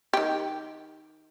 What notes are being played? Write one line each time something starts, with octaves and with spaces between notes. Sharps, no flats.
D#3 G4